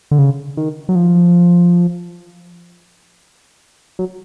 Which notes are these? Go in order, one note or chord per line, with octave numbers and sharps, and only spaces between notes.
D3
C#3
D#3
F#3
F3
F#3